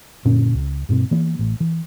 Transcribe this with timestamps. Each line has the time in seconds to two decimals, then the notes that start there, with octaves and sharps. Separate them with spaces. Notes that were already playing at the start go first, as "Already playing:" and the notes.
0.25 F#2 A#2 D3 C#4
0.54 C#2
0.89 G2 B2 C4
1.11 E3 A#3 B3
1.39 A1
1.60 E3